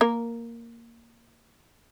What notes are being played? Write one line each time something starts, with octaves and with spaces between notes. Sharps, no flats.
A#3 A#4